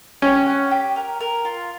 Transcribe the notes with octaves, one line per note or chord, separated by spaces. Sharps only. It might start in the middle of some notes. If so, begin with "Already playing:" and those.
C#4 G4
F#5
G4
A#4
A#4
F4